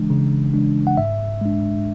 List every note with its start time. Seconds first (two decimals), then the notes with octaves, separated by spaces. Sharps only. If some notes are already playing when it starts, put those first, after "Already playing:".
Already playing: C#3 E3 G#3 D4
0.10 C#3
0.54 E3 G#3 D4
0.87 F#5
0.97 G#2 E5
1.41 G#3 D4